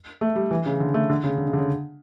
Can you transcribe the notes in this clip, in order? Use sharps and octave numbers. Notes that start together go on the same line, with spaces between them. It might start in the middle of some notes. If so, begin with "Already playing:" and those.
A3
G3
E3
C#3
D3
A3
D3
C#3
D3
C#3
D3
C#3